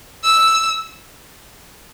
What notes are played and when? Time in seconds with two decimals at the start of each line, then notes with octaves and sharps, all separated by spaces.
0.24 E6